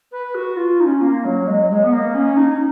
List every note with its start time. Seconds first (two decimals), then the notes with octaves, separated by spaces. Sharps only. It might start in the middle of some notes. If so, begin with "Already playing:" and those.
0.11 B4
0.34 F#4
0.56 F4
0.80 D#4
0.85 C#4
1.01 A#3
1.24 F#3
1.47 G#3
1.61 F#3
1.70 G#3
1.84 B3
1.92 A#3
2.14 C#4
2.36 D#4